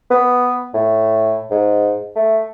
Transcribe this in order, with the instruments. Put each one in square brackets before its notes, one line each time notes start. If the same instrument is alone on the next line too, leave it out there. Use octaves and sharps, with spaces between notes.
[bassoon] B3
A2
G#2
A3